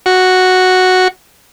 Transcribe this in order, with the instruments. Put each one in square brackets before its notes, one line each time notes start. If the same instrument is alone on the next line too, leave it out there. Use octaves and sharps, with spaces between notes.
[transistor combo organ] F#4